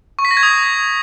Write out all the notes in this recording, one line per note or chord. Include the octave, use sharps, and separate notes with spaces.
C#6
B6
A#6
G#6
D#6